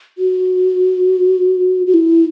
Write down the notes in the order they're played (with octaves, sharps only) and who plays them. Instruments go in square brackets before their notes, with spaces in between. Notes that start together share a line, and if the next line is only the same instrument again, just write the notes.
[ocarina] F#4
F#4
E4